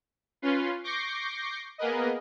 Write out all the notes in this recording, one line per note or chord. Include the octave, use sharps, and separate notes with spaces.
C#4 F4 B4 C6
C#6 D6 G6 A#6 C7
A#3 B3 G#4 A#4 B4 D#5